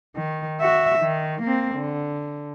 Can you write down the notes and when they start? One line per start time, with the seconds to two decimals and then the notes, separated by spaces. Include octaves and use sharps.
0.16 D#3
0.61 F#4 E5
1.00 D#3
1.43 A#3 C4
1.76 D3